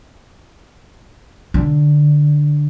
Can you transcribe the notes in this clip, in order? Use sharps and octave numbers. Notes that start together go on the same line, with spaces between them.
D3